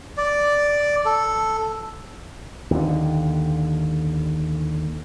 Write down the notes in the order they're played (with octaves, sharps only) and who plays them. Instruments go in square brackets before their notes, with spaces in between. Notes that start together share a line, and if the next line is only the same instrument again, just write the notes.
[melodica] D5
A4
[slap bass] D#2 D3